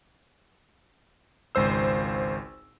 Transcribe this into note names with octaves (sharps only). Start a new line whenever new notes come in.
G#1 C#2 C5 E6